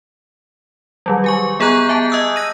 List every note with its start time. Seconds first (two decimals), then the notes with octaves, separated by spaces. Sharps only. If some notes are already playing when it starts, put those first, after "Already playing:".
1.06 D#3 F#3 G3
1.24 G4 G#5 C#6
1.60 B3 G#4 D#5 A#5 F#6 G6
1.89 B3 E5 G#5 A5
2.10 D#5 D#6 E6 F#6 G6
2.36 F#6 A#6 D#7